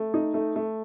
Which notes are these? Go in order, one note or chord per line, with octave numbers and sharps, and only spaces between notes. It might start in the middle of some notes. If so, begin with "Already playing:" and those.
Already playing: A3
D#4
A3
A3